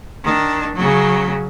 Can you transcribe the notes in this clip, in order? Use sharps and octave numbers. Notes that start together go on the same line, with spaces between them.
D#3 D4
C#3 F#3